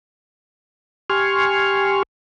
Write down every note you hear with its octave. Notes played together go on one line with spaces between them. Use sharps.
G4 G#5 C6 C#6 F6